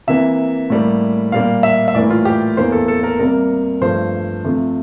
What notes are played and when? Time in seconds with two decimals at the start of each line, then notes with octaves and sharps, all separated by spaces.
0.08 C3 E3 A#3 E5
0.70 A2 G3 A#3
1.32 A#2 G3 A#3 F5
1.63 E5
1.88 E5
1.95 A2 E3 A#3 D5
2.10 F4
2.25 G4
2.57 E2 E3 A#3 C5
2.72 A4
2.88 A4
3.03 A#4
3.20 C3 G3 A#3 A#4
3.81 G2 F3 A3 C5
4.44 C3 F3 A3